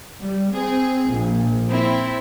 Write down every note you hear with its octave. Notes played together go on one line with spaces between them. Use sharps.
G3
C4 G#4
A#1
C4 E4